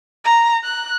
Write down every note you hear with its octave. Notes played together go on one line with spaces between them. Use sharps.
A#5
F#6